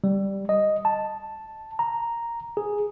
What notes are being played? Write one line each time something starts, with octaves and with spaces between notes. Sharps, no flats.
G3
D#5
A5
A#5
G#4